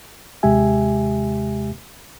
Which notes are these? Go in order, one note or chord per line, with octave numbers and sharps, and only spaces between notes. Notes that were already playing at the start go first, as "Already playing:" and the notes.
D#2 C3 G#3 G4 E5 G#5